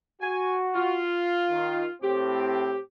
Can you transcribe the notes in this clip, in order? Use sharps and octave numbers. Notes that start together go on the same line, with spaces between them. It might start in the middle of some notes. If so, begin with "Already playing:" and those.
F#4 G#5
F4
D#3
A2 C4 G4